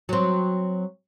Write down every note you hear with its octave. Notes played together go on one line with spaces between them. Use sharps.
F#3 C4